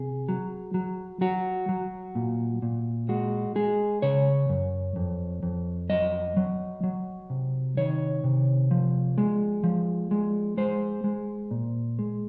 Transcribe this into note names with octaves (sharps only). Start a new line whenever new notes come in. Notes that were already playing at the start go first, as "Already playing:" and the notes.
Already playing: C3 G#4
F#3
F#3
F#3 F#4
F#3
A#2
A#2
G#3 F#4
G#3 G#4
C#3 C#5
F#2
F2
F2
F#3 D#5
F#3
F#3
C3
D#3 C#5
C3
F3
G#3
F3
G#3
G#3 C5
G#3
A#2
G#3